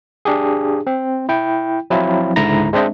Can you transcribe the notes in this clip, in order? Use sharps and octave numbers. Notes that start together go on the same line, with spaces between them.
D4 G4 G#4
C4
E4 G5
F3 F#3 C4 E4 F4
C#2 G#2 D3 E4 A#5 A#6
G#3 C4 D4 C5 D#5 E5